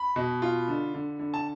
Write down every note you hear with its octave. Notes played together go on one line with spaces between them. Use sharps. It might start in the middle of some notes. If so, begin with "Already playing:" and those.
Already playing: B5
B2
F4
D3
D3
D3
A5